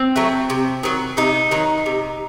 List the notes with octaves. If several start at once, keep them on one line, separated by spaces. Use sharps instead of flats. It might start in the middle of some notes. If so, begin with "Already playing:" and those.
Already playing: C4
F#3 A3
C3
D#3 F#3
C3 D#4
D#3 F#3
C3